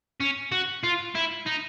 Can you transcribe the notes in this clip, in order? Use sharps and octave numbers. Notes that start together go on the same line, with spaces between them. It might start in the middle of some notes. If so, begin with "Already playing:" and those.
C#4
F#4
F4
E4
D#4